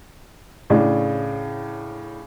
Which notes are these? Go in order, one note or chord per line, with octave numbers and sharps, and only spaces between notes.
A2 C#3 D4